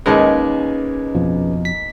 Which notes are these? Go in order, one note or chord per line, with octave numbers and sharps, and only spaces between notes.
D#2 G#3 A#3 C#4 D#4 G#4 B4
F2 B2 F3
B6